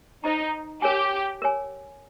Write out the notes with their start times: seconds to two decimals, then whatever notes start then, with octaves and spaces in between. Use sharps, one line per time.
0.24 D#4 C5 D#5 A#5
0.82 G4 A#4 C#5 G#5
1.42 A#4 C#5 G#5